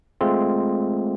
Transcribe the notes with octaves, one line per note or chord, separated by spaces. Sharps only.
G#3 A3 C4 F4